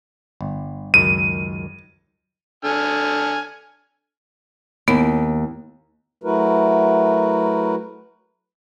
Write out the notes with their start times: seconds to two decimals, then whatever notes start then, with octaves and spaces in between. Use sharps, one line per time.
0.41 G1
0.94 C#2 F#2 D#3 D#7
2.65 D3 G#5 F6
4.88 D#2 B3
6.24 F#3 A3 E4 F#4 A#4 B4